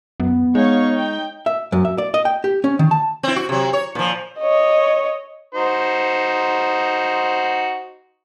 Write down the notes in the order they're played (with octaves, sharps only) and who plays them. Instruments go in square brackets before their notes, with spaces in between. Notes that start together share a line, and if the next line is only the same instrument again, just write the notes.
[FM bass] F#2 [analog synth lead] B3
[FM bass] G#3 [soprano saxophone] D#4 [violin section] C#5 F5 C#6
[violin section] G5
[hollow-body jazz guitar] E5
F#2
E5
D5
D#5
G5
G4
C#4
D#3
A5
[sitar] C4 E4
F#4
C3 F#3
C#5
A#2 F3
[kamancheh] C#5 D#5
[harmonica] D#4 F#4 C5